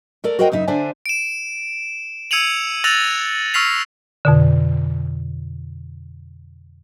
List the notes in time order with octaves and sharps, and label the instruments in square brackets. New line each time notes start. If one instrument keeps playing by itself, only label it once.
[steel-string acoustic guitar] A3 A4 A#4 D5
F#4 A#4 C5 D#5 F#5 G5
F#2 C#3 D#4 E5
D3 D4 C5 D5 E5 G#5
[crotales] D7 E7
E6 G#6 C#7 D#7 F7 F#7
E6 F#6 A6 A#6 F7 F#7
C#6 E6 F6 B6 C7 F7
[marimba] F2 B2 D3